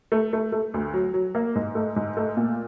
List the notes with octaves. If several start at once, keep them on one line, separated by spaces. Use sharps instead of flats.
A3
A3
A3
D2
F#3
F#3
A#3
G#2
A3
G#2
A3
A#2